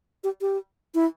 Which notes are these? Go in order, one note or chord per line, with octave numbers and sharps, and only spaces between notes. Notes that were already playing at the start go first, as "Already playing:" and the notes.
G4
G4
E4